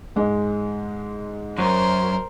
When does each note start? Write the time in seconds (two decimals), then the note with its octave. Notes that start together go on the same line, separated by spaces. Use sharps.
0.16 G#2 G#3
1.58 F#2 A#4 C5